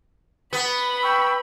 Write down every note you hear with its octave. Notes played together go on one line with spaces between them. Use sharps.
B3 B5
G5 C#6 E6